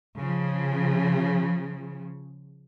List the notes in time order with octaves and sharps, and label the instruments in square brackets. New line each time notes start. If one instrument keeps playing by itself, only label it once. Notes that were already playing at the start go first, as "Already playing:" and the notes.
[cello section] C#3 F3